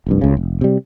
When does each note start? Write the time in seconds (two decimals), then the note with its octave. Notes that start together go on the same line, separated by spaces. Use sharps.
0.07 F1 C2 G2
0.21 C#2 C#3
0.37 F1
0.61 C3 G3